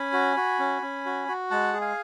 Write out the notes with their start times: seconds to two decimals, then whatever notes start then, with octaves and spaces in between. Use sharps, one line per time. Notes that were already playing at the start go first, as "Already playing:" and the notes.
Already playing: C#4 G#5 B5
0.13 F#4
0.37 F#4
0.59 C#4
0.82 C#4
1.06 F#4
1.28 F#4
1.50 G#3 F#5 A5
1.73 G#4
1.81 F5 G#5